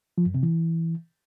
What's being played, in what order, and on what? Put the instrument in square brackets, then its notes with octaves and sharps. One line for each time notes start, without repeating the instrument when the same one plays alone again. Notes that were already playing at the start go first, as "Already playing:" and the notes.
[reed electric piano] F3
F#2
C3
E3